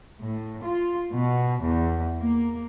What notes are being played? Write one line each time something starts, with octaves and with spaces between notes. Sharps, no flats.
A2
F4
B2
E2
A#3